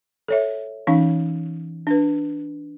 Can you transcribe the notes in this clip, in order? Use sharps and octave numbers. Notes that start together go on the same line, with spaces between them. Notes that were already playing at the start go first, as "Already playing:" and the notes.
A4 C#5 E5
E3 C#4 D#4 F5
D4 B4